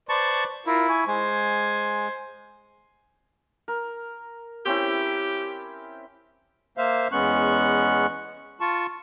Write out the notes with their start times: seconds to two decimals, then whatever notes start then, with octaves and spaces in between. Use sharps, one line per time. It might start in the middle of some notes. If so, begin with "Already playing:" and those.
0.09 B4 C5 D5 A5 C#6
0.66 E4 F4 A#4
0.89 G#5 C#6
1.08 G#3 C5 G#5
3.68 A#4
4.65 C4 C#4 E4 G4
6.78 A#3 C5 E5 F5
7.12 E2 G#3 B3 C#4 C#6 F#6
8.61 F4 A5 C#6